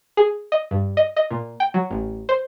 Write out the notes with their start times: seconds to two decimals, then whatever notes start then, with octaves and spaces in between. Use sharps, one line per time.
0.17 G#4
0.52 D#5
0.71 G2
0.97 D#5
1.16 D#5
1.31 A#2
1.60 G5
1.74 F#3
1.91 A1
2.29 C5